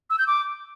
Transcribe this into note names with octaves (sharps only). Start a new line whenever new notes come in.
E6
G6
D6